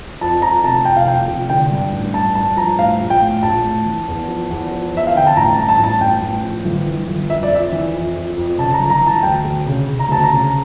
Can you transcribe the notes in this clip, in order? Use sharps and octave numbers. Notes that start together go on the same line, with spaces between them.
F2 A5
F2 A#5
F1 A5
F2 G5
F5
F1 G5
F1
D3 G5
G2
A1
G2 A5
G2 A5
F3 A#5
A2 F5
A#1
G5
A2
A#1 A5
A2
E3
E2
F3
E2
F3
E2 E5
F5
D3 G5
A5
A1 A#5
G2 A5
A5
A1 A5
A1 G5
A1
F3
G1
E3
G1
F2 E5
D5
F2 E5
E3
F2
F2
F2
C#3 A5
A#5
G1
A#5
E3
A5
D2 G5
D2
C#3
C#3
A#5
D2 A5
A#5
C#3